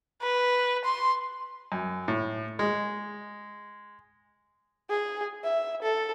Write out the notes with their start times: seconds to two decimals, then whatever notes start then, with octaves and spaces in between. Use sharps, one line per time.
0.22 B4
0.84 C6
1.72 F#2
2.08 A2
2.59 G#3
4.90 G#4
5.44 E5
5.82 A4